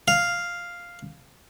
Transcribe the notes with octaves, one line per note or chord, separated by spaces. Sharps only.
F5